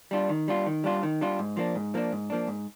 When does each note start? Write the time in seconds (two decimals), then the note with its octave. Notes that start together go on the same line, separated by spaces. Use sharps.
0.11 G3 D4 F4
0.29 D#3
0.48 G3 D4 F4
0.66 D#3
0.84 G3 D4 F4
1.03 D#3
1.21 G3 D4 F4
1.39 G#2
1.57 F3 A#3 D4
1.75 G#2
1.94 F3 A#3 D4
2.12 G#2
2.30 F3 A#3 D4
2.48 G#2